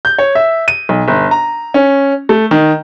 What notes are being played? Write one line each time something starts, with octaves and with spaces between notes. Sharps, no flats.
G6
C#5
E5
D#7
B1
G1
A#5
C#4
A3
D#3